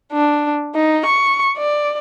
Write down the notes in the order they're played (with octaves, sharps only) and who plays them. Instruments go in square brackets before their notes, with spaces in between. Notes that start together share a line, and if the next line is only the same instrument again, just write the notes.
[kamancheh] D4
D#4
C#6
D5